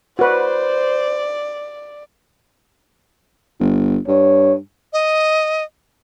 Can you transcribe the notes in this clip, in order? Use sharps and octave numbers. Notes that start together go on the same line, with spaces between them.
F#4 B4 C5 D5
G1
G2 C#5
D#5